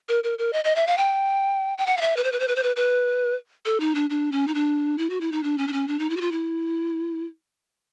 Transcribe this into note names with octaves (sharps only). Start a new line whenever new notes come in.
A#4
A#4
A#4
D#5
D#5
E5
F5
G5
G5
F#5
F5
E5
B4
C5
B4
C5
B4
C5
B4
B4
A4
D#4
D4
D4
C#4
D#4
D4
E4
F#4
E4
D#4
D4
C#4
D4
C#4
D4
D#4
E4
F#4
F4
E4